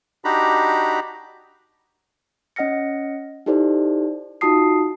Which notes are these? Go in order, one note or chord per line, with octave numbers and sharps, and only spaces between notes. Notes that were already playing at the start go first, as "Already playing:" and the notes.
D4 D#4 F#4 G4 A#5 B5
C#4 D#5 F#5 F6 A#6 C#7
D#4 E4 G4 A4 C5 D5
D#4 F4 F#4 A5 D#6 C7